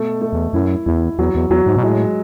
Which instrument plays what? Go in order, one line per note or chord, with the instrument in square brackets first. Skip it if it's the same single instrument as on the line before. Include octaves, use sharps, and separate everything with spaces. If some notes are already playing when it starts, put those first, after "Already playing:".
Already playing: [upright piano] B2 A3
A3
[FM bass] E2
[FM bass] F#2 [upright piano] E4
[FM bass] E2 [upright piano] E4
[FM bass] E2 [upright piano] F#3
[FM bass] E2
[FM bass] E2 [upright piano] F#3
[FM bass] G#2
B2
[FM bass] A2 [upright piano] G#3